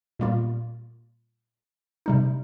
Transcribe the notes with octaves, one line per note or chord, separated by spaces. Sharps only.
A#2 G3 A#3 F4
C3 G3 D#4